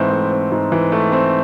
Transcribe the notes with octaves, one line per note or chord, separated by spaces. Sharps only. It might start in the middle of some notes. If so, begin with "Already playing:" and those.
Already playing: G#2 E3 A3 C4
A3
C4
G#2
E3
A3
C4